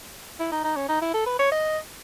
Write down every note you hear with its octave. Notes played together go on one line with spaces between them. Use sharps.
E4
D#4
D#4
C#4
D#4
E4
A4
B4
C#5
D#5